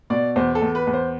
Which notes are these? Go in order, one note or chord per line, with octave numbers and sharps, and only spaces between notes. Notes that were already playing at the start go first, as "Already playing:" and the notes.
B2 D5
E2 C5
A4
E2
B4
E2
C5